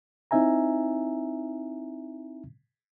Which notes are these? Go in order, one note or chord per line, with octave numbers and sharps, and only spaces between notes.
C4 D#4 E4 E5 G#5 A#5